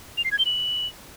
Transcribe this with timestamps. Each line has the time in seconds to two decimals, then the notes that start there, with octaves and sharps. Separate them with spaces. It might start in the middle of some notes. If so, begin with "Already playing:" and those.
0.18 F7
0.25 C7
0.32 G#6
0.39 G7
0.46 F#7